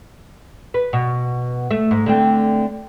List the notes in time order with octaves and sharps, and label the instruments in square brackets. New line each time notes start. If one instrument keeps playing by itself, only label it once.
[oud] B4
B2
A3
G#2
D3 A3 C4